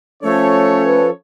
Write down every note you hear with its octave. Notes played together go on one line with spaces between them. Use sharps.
F3 A3 C#4 A4 C#5
B4